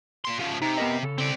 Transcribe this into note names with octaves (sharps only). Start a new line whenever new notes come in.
A#2 C6
C#3 F3
C3 D#4
B3 A#4 D#5
C#3 A4
C4 D5